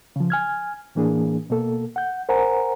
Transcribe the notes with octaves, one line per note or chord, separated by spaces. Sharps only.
C#3 F3
G#5 F6 G#6
A2 E3 A#3 D4 G#4
B2 A#3 A4
F#5 G6
A#4 C5 F#5 G#5 A#5